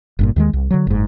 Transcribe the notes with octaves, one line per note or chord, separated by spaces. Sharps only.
G1 G2 A#2
D#2 D#3 G#3
C2
D3 F#3
F#1 G#2